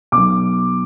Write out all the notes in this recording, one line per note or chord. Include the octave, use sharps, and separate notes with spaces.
B2 D6
B1